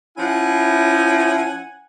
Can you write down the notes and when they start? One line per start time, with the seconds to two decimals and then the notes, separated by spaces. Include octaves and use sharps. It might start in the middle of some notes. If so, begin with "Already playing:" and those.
0.17 F3 C#4 E4 F#5 G#5